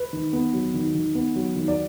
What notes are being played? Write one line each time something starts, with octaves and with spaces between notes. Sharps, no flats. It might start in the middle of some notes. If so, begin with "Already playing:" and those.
Already playing: B4
D#3
B3
F#3
D#3
D#3
B3
F#3
D#3
D5